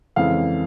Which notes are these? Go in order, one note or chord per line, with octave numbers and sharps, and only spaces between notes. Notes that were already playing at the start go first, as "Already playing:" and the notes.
F2 C#3 E3 G#3 F5